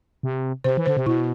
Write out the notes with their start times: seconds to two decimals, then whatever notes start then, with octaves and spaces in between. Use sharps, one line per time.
0.23 C3
0.64 C3 C5
0.77 E3
0.86 D3 C5
0.97 C3
1.06 B2 E4